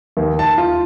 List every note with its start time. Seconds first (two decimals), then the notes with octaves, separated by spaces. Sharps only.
0.17 D#2
0.39 A5
0.58 F4